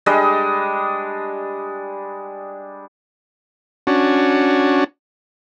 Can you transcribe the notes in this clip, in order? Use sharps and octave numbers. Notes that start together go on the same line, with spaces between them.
G3 G#3 D4 D#5
C#4 D4 F#4